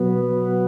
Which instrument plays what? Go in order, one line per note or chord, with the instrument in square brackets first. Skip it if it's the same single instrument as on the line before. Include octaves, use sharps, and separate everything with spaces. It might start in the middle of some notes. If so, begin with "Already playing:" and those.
Already playing: [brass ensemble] B2 F#3 B3